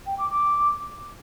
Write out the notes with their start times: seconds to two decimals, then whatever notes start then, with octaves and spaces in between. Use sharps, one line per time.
0.06 G5
0.18 D6
0.30 D6